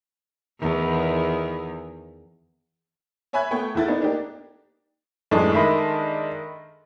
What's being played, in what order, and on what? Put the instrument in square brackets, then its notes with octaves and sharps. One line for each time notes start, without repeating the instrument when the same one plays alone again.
[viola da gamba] E2 D#3
[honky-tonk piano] C#5 E5 G#5 B5 F#6 G#6
A3 B3 G5 C#6
E2 A3 E4 A6
A3 B3 D4 D#4
A#3 D4 D#4 G4
[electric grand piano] F#2 A2 E3 [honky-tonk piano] G#3 D4 [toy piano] A4
[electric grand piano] D#3 A#4 D#5 [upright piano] E5 B5 C6